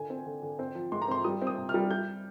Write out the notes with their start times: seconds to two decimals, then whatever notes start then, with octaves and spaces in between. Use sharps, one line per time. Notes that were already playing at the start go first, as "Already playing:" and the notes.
Already playing: D3 G#5
0.10 C4
0.26 D3
0.42 D3
0.59 C4
0.75 F3
0.92 G#3 C6
1.02 A#5
1.08 C4 C6
1.24 G3 D#6
1.42 C4
1.47 D#6
1.58 C3
1.69 F6
1.74 G3
1.91 G3 G6